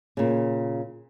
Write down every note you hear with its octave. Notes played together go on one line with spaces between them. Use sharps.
A#2 C#3